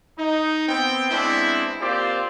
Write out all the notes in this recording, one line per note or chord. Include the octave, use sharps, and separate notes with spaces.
D#4
B3 C4 G5
G#3 B3 C4 D4 E4
A#3 C4 F4 G4 C5 D5